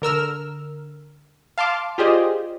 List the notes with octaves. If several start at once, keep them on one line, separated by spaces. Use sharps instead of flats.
D3 A#4 E6 F6
F5 A5 C6 D6
F4 G4 G#4 C5 D5 D#5